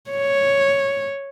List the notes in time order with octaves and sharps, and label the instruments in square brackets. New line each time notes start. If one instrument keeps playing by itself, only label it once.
[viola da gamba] C#5